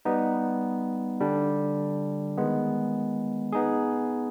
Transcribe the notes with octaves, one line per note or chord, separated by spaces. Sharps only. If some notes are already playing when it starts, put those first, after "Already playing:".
G3 B3 D#4
D3 G3 D4
D#3 G#3 B3
B3 D#4 G#4